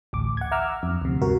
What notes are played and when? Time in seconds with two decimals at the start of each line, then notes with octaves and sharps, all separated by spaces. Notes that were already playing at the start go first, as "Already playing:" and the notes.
0.13 A1 D2 D6
0.37 F#5 G#6
0.51 E5 F#5 A#5 D6 E6 F6
0.83 F2
1.01 D2 C3
1.21 G2 C3 F#4 A#4